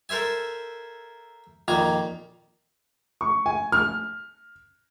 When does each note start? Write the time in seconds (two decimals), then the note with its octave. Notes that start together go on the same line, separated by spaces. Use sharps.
0.09 A4 A#4 C5 E5 G#5
1.68 F2 A#2 D#3 G#5 A#5
3.21 C#6
3.46 G#5
3.72 F6